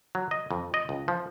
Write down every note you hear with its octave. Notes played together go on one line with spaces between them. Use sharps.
F#3
D#5
F2
D#5
C#2
F3